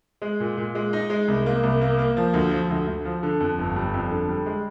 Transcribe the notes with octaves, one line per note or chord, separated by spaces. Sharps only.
G#3
A#2
A#2
G#3
D#4
G#3
C2
A#3
C2
A#3
A#3
F3
D2
F3
D2
D2
F3
D3
F2
G1
G3
F2
D3
G3
G#3